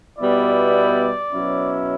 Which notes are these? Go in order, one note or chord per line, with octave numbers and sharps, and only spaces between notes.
B2 G3 B3 E4 D5
B2 F#3 C#4 E4